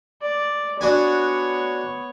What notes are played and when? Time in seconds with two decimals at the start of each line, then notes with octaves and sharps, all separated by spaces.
0.22 D5
0.81 B3 D4 F#4 C#5 G#5